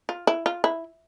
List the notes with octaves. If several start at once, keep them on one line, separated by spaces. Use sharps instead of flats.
F4
E4
F4
E4